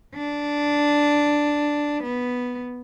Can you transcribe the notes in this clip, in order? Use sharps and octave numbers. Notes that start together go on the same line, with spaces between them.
D4
B3